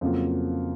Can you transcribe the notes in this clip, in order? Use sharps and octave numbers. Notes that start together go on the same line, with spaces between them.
F2 C#3 F#3 A#3 F4